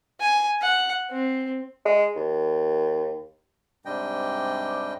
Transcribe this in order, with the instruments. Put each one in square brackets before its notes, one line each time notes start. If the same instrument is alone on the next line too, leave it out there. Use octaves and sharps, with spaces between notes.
[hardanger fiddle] G#5
F#5
C4
[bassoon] G#3
D#2
[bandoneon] G#2 C3 G3 D4 D#5 G5